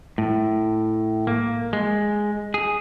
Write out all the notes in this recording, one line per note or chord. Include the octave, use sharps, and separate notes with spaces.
A2
A#3
G#3
G#4